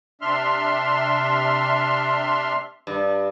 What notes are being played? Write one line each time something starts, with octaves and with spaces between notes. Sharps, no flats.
C3 D4 E5 C6 F6
G2